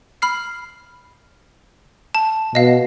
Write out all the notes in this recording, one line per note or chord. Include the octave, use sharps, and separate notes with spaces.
B5 F6 C7
A5
B2 D#5 F5